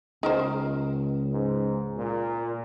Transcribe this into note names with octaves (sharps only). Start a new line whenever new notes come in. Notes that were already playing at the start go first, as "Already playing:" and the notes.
C#2 D#4 A#4 C5
G#2
A#2